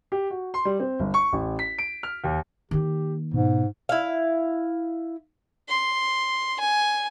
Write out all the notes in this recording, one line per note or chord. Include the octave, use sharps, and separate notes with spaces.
G4
F#4
C6
G3
C4
G1
C#6
A1
B6
D7
F6
D#2
D#3 A#3 G4
G#2 B2
E4 F5
C6
G#5